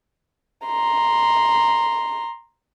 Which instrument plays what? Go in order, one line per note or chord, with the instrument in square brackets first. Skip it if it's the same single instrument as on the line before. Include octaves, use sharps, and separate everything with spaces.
[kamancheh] A#5 C6